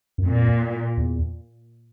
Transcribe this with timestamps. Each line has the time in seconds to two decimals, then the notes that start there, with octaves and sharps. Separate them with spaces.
0.18 F#2
0.25 F2 A#2
0.97 E2